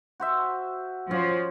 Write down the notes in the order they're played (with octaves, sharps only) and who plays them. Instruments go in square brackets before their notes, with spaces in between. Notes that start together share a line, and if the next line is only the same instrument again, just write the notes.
[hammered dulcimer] F#4 C5 E5
[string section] F3 [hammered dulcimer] C#4